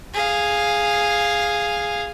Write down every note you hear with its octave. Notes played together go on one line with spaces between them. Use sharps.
G#4 F5